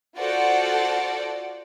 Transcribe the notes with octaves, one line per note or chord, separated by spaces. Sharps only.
F4 F#4 A4 C5 D5 F#5